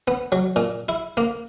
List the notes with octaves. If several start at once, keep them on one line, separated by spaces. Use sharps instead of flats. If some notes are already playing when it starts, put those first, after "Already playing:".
B3
F#3
A#2
E4
A#3